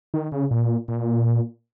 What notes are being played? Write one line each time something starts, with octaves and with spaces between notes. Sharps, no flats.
D#3
C#3
A#2
A#2